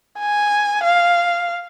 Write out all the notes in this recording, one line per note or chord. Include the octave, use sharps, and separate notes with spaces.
G#5
F5